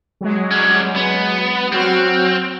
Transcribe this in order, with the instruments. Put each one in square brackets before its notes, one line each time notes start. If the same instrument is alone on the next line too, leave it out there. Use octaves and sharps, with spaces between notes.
[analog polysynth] F#3 G#3
[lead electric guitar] G3 C#4
B3
[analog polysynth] F#3 F#4 F6 [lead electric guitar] C4